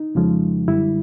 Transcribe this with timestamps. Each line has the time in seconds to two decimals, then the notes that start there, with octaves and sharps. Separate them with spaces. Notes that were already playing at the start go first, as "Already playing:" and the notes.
Already playing: D#4
0.15 F2 C#3 F3 G#3
0.68 F#2 D3 G3 E4